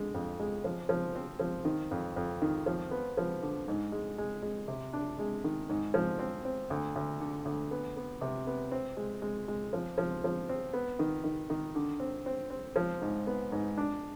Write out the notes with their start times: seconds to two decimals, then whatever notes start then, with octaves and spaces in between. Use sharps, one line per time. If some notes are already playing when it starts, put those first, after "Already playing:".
Already playing: D3 G#3
0.14 F2
0.40 G#3
0.64 F3
0.89 F3
1.15 C4
1.40 F3
1.65 D#3
1.91 F2
2.16 F2
2.42 D#3
2.66 F3
2.91 B3
3.17 F3
3.42 D3
3.68 G#2
3.92 G#3
4.18 G#3
4.42 G#3
4.68 C3
4.93 D4
5.19 G#3
5.44 D#3
5.69 G#2
5.94 F3
6.19 C4
6.45 C4
6.70 D2
6.96 D2
7.20 D3
7.45 D2
7.71 B3
7.97 B3
8.21 C3
8.47 B3
8.71 C4
8.97 G#3
9.22 G#3
9.48 G#3
9.73 F3
9.98 F3
10.24 F3
10.49 C4
10.73 B3
10.99 D#3
11.24 D#3
11.50 D#3
11.75 D3
12.00 C4
12.26 C4
12.50 C4
12.76 F3
13.02 G#2
13.27 B3
13.52 G#2
13.77 D4